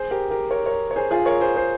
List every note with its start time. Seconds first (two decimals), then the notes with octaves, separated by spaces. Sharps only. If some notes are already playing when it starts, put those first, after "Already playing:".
Already playing: G#4 C5
0.11 G4 A#4
0.30 G4 A#4
0.50 A#4 C#5
0.66 A#4 C#5
0.91 C#5
0.96 G#4 C5
1.11 F4 G#4
1.26 A#4 C#5
1.41 G#4 C5
1.56 G#4 C5